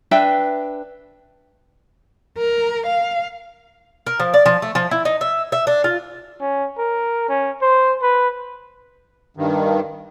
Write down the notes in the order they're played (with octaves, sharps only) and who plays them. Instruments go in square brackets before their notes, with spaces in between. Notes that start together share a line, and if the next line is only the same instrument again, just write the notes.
[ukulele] D4 B4 E5 G5
[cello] A#4
F5
[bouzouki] A#4
F3
D5
F3
A3
F3
E4
D#4
E5
E5
D4
F4
[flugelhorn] C#4
A#4
C#4
C5
B4
[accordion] G2 D#3